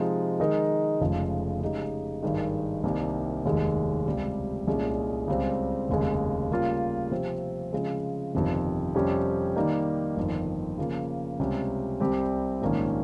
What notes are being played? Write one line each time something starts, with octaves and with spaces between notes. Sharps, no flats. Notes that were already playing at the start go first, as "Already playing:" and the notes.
Already playing: C3 F3 G#3 D#4
D#3 G#3 D#4 A#4 D#5
F1 F2 C#3 F3 G#3
C#3 G#3 D#4 G4
G#1 G2 D#3 G#3
C2 C3 D#3 A#3
F1 D#2 D#3 G#3
C#2 C3 G3
C2 A#2 G#3 C#4 G#4
C#2 C#3 G3 C4
F1 D#2 C#3 G#3
C#3 G3 A#3 F4
C3 F3 C4 G4
C#3 F3 G#3
G1 F2 C3 D#3
F2 C3 G3 C#4 G4
D#3 G3 A#3 D#4
G1 F2 D#3
C#3 F3 A#3
C#2 C3 G3 C#4
C2 C3 G3 C4 G4
A#1 G#2 D#3 A#3 C#4